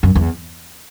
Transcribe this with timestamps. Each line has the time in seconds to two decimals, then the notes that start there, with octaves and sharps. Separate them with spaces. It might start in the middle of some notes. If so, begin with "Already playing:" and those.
0.03 F#2
0.15 E2